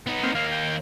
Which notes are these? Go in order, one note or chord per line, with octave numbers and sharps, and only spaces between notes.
B3 D#4
A#3 C4
D#2 A#3 F5
G5